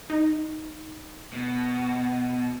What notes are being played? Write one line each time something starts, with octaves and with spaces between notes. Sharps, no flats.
D#4
B2